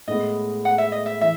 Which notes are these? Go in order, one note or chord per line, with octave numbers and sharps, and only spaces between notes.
A2 G#3 B3 D#5
F#5
E5
D#5
E5
E3 E5